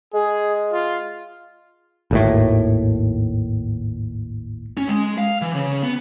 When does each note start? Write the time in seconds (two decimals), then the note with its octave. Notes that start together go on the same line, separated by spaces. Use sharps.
0.14 G#3 G#4
0.72 F4
2.11 G#1 D#2 A2
4.77 C#4
4.89 G#3
5.18 F5
5.42 E3
5.55 C#3
5.83 B3